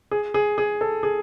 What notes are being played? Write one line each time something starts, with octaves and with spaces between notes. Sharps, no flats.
G#4
G#4
G#4
A4
G#4